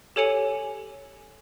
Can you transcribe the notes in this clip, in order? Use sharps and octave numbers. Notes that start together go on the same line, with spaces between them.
G4 A4 C#5 G#5 C#7 F7